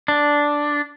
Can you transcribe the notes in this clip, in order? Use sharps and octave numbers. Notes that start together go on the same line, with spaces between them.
D4